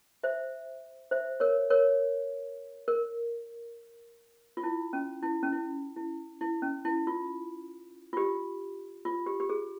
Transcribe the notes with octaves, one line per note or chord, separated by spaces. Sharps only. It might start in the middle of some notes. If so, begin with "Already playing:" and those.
C5 E5
C5 E5
A#4 C#5
A#4 C#5
A#4
F4
E4
C#4
E4
C#4
E4
E4
E4
C#4
E4
F4
F4
G4
F4
G4
G4
G#4